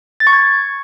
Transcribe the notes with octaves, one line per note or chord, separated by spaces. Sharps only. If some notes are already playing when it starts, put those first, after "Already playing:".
A6
C#6
G#6